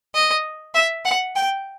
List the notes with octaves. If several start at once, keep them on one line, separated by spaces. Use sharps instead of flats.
D#5
E5
F#5
G5